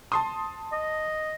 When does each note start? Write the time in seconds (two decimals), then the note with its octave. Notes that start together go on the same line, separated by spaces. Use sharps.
0.12 A5 C6 D#6
0.72 D#5